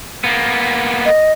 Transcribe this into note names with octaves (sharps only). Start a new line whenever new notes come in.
A#3 B3
D#5